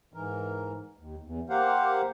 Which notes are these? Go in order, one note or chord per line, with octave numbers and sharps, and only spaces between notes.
G#2 E3 A#4
D#2
E2
A#3 G4 A#4 C5 F5 F#5